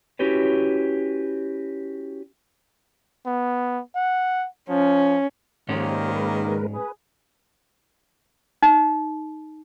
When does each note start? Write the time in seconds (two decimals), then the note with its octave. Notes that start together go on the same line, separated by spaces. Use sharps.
0.19 C#4 E4 F#4 G4 B4 C#5
3.26 B3
3.95 F#5
4.69 F3 C#4
5.69 G#2 D#3 A#3 C#4 G4 C5
6.16 G#3 A#4 B4
6.73 G#4 B4
8.63 D#4